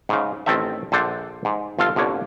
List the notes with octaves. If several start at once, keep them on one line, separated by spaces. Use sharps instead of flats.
G#2 C#3
A1 D#3 C4 A4 E5
A#1 A4 C5 D5 F#5
G#2
G1 F4 A4 F5 A5
G1 C2 D3 A#3 C#5